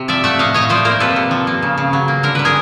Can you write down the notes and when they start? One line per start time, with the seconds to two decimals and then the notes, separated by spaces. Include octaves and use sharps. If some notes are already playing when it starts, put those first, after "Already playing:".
Already playing: C3
0.08 F3 D5 E5
0.24 A3 E5 F#5
0.39 A2 D#5 F5
0.54 A2 C#5 D#5
0.69 F3 C5 D5
0.85 A#3 A#4 C5
1.00 C3 A4 B4
1.16 C3
1.31 F3
1.47 A#3
1.62 C#3
1.78 C#3
1.93 F#3
2.08 A#3
2.23 D3 A#4
2.35 D3 B4
2.45 G#4 A#4